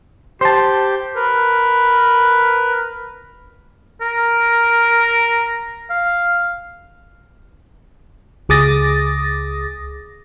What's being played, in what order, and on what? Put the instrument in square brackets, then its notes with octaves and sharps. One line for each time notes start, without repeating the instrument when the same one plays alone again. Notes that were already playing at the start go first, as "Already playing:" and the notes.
[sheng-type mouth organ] G4 G6 [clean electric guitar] C5 A5
[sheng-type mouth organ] A#4 B4
[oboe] A#4
F5
[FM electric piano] C#2 G#4 D6 D#6 A6 A#6